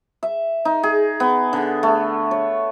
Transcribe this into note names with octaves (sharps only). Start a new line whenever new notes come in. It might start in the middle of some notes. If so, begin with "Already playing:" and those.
E5
D#4
G#4
B3
D3
A3
C#5